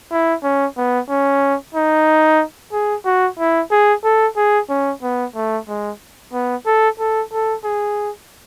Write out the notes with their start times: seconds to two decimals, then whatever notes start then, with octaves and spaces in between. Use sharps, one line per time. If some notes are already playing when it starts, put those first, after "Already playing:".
0.11 E4
0.43 C#4
0.77 B3
1.09 C#4
1.74 D#4
2.72 G#4
3.05 F#4
3.39 E4
3.71 G#4
4.04 A4
4.37 G#4
4.69 C#4
5.02 B3
5.35 A3
5.68 G#3
6.33 B3
6.66 A4
6.99 A4
7.32 A4
7.65 G#4